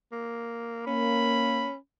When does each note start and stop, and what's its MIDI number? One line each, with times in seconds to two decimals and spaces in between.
0.12 0.85 58
0.87 1.68 58
0.87 1.76 61
0.87 1.76 83